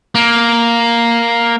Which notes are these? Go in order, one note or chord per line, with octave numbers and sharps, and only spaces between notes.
A#3